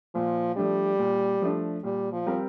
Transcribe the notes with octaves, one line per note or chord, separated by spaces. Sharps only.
A#2 F3
F3 G3 A3 D4
A#2
F3 A3 D4
A#2 G3
F3
G3 C4 G4 A#4